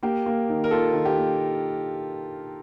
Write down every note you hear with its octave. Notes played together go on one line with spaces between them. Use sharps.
A#3 G4
A#3
D#3
A#4
A#3 F4 A4
D#3
G4
A#3